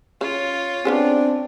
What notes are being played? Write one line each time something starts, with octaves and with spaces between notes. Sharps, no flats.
C#3 F4 C#5
C#3 B3 C4 D4 G#4